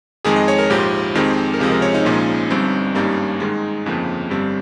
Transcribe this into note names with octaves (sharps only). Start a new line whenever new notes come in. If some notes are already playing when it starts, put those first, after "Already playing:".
F2 D#3 G#3 G#4
D#5
C#5
A#4
A#1 G#2 F3 G4
F2 D#3 G#3 C4
A#4
C#2 C3 F3 G#3 G#4
A#4
C#5
D#4
A#1 A#2 F3 G#3 C#4
G1 G2 G3 C4
G#1 G2 G3 A#3 C#4 D#4
G#2 D#3 G#3
G1 F2 C#3 F3 A#3
G1 G2 G3 C4